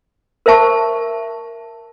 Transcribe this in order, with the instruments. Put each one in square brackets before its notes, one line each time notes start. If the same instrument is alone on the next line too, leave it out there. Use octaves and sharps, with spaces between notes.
[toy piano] A#4 C5 E5 A5 C#6